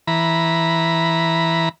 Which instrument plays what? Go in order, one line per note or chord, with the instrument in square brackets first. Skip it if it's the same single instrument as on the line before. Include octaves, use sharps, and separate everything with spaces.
[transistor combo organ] E3 A#5 B5